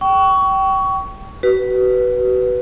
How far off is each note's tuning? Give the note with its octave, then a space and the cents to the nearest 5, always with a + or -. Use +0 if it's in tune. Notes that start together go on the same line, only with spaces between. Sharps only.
G5 -25 C#6 +20
F#4 +35 B4 +0